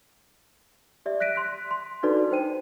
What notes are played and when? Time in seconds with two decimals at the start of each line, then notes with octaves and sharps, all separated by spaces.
1.06 G4 D5 E5
1.20 F#6 A#6 B6 D7 D#7
1.35 C6 F#6 B6
1.71 C6
2.03 D4 D#4 F#4 A4 B4 D5
2.31 D#4 C5 G5 D#7